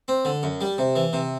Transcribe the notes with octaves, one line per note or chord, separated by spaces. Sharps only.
C4
D3
F#2
G3
C3
E3
C3